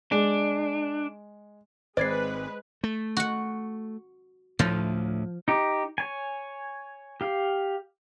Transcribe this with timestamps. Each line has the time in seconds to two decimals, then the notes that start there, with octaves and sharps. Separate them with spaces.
0.12 G#3 D4
1.97 G#1 G#3 C4 B4 C5 D5 G#6 C7
2.84 A3
3.17 F#4 F#5
4.59 D2 A2 F3
5.48 D#4 G4
5.98 C#5 G#5
7.21 G4 F5